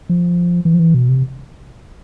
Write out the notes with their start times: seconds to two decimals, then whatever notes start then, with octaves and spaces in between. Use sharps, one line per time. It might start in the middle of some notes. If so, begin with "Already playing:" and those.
0.09 F3
0.65 E3
0.74 F3
0.79 E3
0.94 B2
1.09 C3